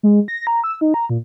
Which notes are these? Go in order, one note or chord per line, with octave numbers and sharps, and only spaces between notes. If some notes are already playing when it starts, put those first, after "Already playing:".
G#3
A#6
A#5
E6
D#4
A#5
A#2